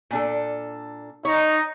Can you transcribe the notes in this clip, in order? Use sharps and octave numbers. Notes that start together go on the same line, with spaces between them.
A#2 D4 A4
D#4 C#5